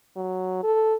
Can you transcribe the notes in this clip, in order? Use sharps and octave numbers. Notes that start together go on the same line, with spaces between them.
F#3
A4